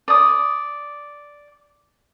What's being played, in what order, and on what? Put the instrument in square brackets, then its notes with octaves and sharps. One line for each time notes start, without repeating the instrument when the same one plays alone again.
[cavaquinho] D5 D#6